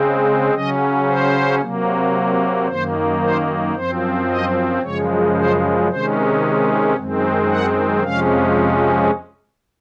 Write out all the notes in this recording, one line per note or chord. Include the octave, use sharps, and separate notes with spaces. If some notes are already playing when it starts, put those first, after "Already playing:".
Already playing: C#3 G#3 C4
C#3 F#3 C#4 D#5
C5
C3 F#3 A#3
F#2 D#3 A#3 C5
C5
F#2 F3 C4 C5
D#5
F#2 C#3 F3 G#3 C#5
C5
C3 D#3 G#3 C#4 C5
F#2 D#3 G#3 C4
F#5
F2 C3 F3 G#3 C#4 F5